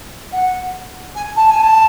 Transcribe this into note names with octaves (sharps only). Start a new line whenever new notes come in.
F#5
G#5
A5
G#5
A5